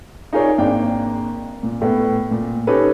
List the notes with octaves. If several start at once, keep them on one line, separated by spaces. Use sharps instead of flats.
D#4 F4 G#4 A#4 C#5 D5
G#1 A#3 D4 G5
A#2
A2 B3
A#2
C#4 D#4 G4 A4 B4 C#5